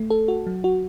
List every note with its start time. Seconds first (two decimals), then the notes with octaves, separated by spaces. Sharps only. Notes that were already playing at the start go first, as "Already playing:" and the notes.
Already playing: A3
0.10 A4
0.28 F#4
0.47 F#3
0.64 F#4